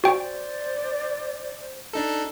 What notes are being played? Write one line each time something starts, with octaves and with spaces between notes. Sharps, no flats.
F#4 C5 D5 G5
D4 D#4 A4